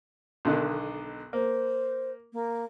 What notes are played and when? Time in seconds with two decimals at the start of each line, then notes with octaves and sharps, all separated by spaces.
0.45 B1 D3 D#3
1.33 A#3 C5
2.32 A#3